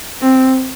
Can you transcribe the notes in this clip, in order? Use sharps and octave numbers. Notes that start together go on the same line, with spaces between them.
C4